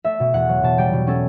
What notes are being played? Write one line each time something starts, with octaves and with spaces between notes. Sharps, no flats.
A3 E5
B2
E2 F#5
F#3
B2 A5
G3 G5
B2
C#4 A4